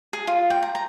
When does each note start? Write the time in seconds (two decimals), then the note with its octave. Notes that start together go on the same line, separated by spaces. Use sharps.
0.13 G#4
0.27 F4
0.50 G5
0.62 A#5
0.75 A#5